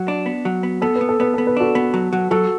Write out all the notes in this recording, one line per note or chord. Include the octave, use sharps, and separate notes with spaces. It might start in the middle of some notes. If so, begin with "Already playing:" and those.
Already playing: F#3
D4
B3
F#3
B3
B3 A4
B4
B3
A4
B3 B4
B3 A4
B4
D4 F#4 A4
B3
F#3
F#3
F#3 F#4 A4